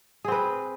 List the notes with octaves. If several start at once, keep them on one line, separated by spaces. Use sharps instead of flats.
C4 G#4 B4